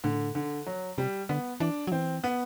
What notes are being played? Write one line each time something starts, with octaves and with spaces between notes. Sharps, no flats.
A2 D3
D3
F#3
C3 G3
D3 B3
E3 D4
F#3
E3 C4
B3